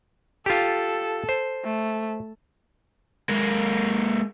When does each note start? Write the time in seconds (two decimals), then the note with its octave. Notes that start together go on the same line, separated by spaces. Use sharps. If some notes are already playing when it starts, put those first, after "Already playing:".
0.46 F4 G4 A4
1.29 C5
1.64 A3
3.29 G#3 A#3